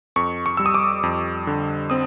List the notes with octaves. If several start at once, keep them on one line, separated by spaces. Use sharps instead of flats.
F2 C#6
C#6
G3 E6
D#6
D6
F2
D3
C4 D#6